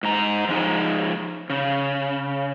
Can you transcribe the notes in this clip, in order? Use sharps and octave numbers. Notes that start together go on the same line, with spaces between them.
G#2 A#5
F3 G#3 D#4
C#3